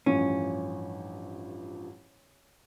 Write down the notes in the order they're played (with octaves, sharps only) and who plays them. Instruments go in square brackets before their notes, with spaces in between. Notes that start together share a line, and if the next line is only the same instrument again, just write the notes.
[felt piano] A1 G2 F3 [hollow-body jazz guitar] C#4